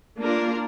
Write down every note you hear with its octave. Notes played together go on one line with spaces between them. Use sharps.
A#3 D4 F4 A#4